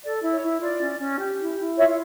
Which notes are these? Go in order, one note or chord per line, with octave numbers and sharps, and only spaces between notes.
A4 D5
E4
C#5
E4
F4 D5
C#4
C#4
G4
E4
E4
F4 C#5 E5